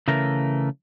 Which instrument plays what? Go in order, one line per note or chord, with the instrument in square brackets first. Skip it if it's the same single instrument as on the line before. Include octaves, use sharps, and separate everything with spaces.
[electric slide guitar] C#3 E3 A3 A#4